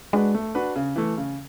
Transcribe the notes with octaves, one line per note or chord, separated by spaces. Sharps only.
G#3 D4 F#4 B4
A3
D4 F#4 B4
C#3
E3 A3
C#3